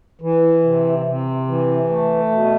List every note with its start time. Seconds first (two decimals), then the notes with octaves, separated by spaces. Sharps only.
0.21 E3
0.63 C3
1.06 C3
1.47 E3
1.89 A3
2.31 B2